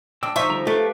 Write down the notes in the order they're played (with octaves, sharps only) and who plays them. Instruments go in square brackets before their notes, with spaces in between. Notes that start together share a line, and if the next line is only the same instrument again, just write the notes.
[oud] D4 [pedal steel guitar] D5 G5 E6
[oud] F3 D#4 [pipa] C5 E5 [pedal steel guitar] C#6
[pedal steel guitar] D3 G3 A#5
[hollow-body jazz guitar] A3 [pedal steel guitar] G4 B4 F5